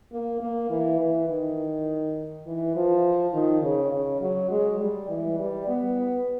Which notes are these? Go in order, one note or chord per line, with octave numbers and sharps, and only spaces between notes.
A#3
A#3
E3
E3
D#3
E3
F3
D#3
C#3
C#3
F#3
G#3
G3
E3
G3
B3